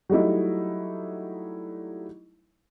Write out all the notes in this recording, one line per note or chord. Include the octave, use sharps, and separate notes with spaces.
F#3 G3 A3 D#4 E4